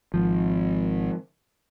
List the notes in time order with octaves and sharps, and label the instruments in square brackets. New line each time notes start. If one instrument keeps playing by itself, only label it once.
[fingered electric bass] G#1 [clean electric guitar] F3